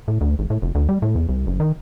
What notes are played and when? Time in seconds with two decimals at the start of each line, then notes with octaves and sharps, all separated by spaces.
0.08 A2
0.21 D2
0.39 G#1
0.50 A2
0.62 F1
0.75 D2
0.89 G3
1.02 A2
1.16 E2
1.29 C2
1.47 F#1
1.60 D#3